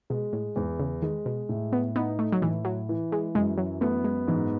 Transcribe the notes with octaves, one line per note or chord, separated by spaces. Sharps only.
B2 G#3
A2
E2 G#2
C#3
D#3 G#3
B2
A2
B3
B3 D#4
A3
F#3
A2 E3
F#3
E3
G#3
F#2 G#3
F#3
A3 B3
G#3
G#2 E3